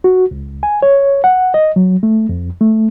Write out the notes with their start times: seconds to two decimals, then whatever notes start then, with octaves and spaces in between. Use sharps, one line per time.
0.04 F#4
0.31 C#2
0.63 G#5
0.82 C#5
1.24 F#5
1.54 D#5
1.76 F#3
2.03 A3
2.29 F2
2.61 A3